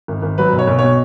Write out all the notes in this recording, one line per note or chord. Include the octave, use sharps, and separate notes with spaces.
G#1
G#1
F#3 B4
B1
C#5
B1
B2 C#5